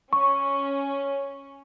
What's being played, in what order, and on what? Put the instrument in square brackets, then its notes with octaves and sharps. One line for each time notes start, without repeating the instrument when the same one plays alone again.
[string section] C#4 [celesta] C#6